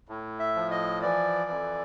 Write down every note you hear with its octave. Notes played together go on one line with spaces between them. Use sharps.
A2
E5
F3
D#5
E3 D5
F2